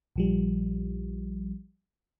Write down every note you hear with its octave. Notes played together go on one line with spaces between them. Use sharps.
A#1 F3 G3